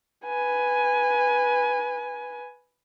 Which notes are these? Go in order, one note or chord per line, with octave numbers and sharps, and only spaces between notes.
B4 G#5